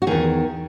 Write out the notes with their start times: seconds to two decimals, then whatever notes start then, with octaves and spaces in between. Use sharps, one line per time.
0.02 F#4
0.07 E2 D#3 G#4